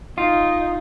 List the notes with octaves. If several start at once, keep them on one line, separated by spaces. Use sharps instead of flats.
D#4 F4